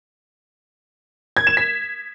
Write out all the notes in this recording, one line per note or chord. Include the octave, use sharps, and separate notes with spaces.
G#6
E7
B6